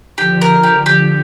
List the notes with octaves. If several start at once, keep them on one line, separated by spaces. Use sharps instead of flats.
D3 F3 G4
A#4
G4
G4